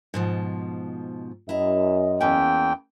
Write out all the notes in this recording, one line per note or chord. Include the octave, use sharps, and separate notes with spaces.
G#2 B2 F3
F#2 E4 D#5 A#5
E2 A#3 C#4 G5